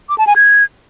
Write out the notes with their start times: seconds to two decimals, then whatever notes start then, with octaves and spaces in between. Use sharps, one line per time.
0.09 D6
0.18 A5
0.27 G#5
0.36 G#6